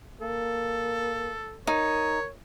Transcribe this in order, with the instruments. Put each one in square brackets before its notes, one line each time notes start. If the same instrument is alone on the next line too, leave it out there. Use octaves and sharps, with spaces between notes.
[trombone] A#3 [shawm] A4
[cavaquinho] D#4 [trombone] A#4 [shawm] C#5